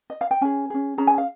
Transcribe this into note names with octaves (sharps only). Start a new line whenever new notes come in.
D#5
F5
G5
C#4 G#4 G#5
C#4 G#4
C#4 G#4 A#5
G#5
F5